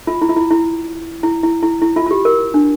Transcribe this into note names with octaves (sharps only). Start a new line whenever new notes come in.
F4
E4
F4
E4
E4
E4
E4
E4
E4
F4
F4
G4
A#4
D4